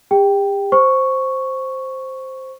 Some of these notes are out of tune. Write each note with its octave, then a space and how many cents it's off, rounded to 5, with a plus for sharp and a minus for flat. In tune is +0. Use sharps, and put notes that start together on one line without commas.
G4 +40 G5 +0
C5 +0 C#6 +0